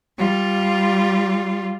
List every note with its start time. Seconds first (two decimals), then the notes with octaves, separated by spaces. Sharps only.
0.16 G3 F4